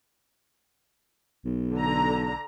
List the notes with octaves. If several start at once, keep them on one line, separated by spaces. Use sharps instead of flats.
B1
D3 A#5